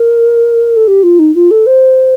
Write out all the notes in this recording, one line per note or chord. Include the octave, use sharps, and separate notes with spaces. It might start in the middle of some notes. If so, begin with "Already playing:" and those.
Already playing: A#4
A4
G4
F4
D#4
F4
A4
C5